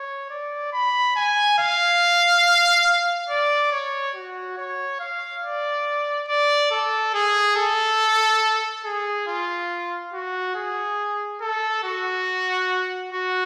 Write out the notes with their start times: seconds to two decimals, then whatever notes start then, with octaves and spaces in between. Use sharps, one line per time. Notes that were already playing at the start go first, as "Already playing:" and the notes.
Already playing: C#5
0.30 D5
0.73 B5
1.16 G#5
1.59 F5
3.30 D5
3.72 C#5
4.15 F#4
4.58 C#5
5.00 F5
5.43 D5
6.28 D5
6.71 A4
7.14 G#4
7.57 A4
8.85 G#4
9.27 F4
10.13 F#4
10.55 G#4
11.41 A4
11.83 F#4
13.12 F#4